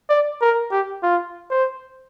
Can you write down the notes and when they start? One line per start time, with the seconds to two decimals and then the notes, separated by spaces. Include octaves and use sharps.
0.10 D5
0.41 A#4
0.71 G4
1.03 F4
1.50 C5